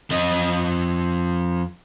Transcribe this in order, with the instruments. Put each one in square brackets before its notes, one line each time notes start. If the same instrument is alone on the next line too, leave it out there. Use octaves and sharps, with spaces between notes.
[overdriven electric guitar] F2 D#5